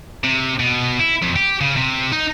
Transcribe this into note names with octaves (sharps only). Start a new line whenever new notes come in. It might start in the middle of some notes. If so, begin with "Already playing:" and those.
C3
B2
E4
F2
G4
C#3
C3
D#4